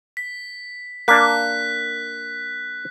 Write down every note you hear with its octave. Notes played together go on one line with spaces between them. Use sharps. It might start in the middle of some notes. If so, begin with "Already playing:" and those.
B6
A#3 D4 F#6 B6